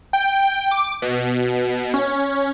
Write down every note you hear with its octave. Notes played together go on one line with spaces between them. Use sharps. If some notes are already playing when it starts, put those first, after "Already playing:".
G5
D6
B2
C#4